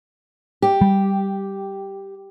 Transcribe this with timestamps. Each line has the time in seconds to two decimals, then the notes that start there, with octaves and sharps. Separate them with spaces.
0.62 G4
0.81 G3